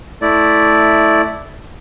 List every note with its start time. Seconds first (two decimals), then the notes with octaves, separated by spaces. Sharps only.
0.22 A3 E4 D5